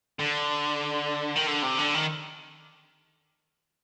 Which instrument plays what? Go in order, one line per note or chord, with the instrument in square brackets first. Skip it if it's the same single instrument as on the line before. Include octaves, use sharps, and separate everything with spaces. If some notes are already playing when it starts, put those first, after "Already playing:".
[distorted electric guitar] D3
D#3
D3
C3
D3
D#3